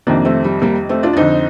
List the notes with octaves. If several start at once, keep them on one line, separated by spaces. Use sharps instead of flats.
F2 C3 D#3 A#3 D4
A3 C4
G3
G3 A#3
A3 C4
D4 F4
D4
F2 D3 C4 D#4